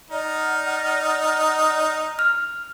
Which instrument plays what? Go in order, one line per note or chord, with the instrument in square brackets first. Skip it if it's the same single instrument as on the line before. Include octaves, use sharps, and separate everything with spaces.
[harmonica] D#4 [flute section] D5 F#5 F6
[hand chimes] F6